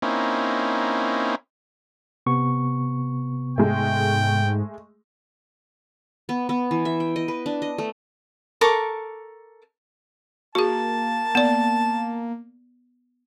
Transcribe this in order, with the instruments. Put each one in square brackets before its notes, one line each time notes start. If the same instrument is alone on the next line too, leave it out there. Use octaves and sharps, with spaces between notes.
[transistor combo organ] A#3 C4 C#4 D#4 E4
[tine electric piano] C3 B3 C#6
[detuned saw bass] G#2 [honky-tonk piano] G#3 A3 [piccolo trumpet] G5
[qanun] B3
B3
E3
E5
G5
D#5
B4
D4
D#5
A3
[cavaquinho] A4 A#4 C#6 D6
[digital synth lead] A#3 [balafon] F#4 G#4 [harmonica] A5
[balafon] B3 D5